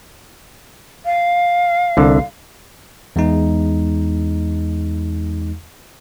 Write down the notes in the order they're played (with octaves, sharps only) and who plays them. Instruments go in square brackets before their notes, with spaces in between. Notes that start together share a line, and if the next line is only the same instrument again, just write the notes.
[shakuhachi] F5
[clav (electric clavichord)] C2 D3
[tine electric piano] E2 G#3 D#4